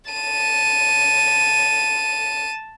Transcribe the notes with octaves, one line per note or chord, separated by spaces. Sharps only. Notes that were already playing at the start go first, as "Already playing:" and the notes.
A5 D#7